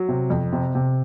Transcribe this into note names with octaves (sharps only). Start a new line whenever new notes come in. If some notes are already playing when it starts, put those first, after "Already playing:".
Already playing: F#3
C3
F2
C3
C3